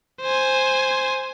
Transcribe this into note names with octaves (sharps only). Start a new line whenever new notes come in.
C5 G#5